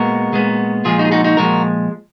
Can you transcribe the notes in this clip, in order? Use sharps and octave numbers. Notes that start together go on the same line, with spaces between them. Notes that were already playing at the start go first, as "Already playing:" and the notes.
Already playing: A#2 G#3 B3 F#4 A#4
A#2 G#3 B3
A#2 F3 G#3 F4 G#4
D#4 F#4
G#4
D#4 F#4
D#4 F#4
A#2 F3 G#3 F#4 A#4